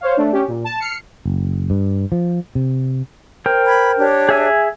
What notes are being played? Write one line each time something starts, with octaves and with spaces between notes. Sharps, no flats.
C5 C#5 F5
A3 D4
C#4 G4
A#2
A5
F6 C7 C#7
F#1
G2
F3
C3
A#4 C5 G5
B5 G#6
D4 G4 C#5
G#4 E5 G#5